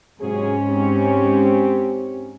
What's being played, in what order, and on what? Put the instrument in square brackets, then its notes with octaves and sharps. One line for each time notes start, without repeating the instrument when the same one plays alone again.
[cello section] G#2 C#4 [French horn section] C3 F#3 G#4
[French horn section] C4 G4